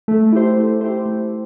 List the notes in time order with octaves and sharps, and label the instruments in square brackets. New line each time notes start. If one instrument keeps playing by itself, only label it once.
[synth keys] A3
E4 G4 C5
A3
E4 G4 C5
A3